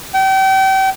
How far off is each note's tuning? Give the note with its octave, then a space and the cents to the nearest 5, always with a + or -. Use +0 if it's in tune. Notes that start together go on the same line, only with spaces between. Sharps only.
G5 -35